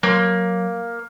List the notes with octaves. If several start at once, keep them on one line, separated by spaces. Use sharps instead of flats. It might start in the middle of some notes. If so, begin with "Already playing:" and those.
F#3 A#3 C6